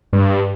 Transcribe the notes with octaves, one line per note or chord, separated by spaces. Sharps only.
G2